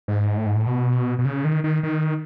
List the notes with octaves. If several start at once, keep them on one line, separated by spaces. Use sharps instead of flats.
G#2
A2
G#2
A2
B2
B2
C#3
D#3
D#3
D#3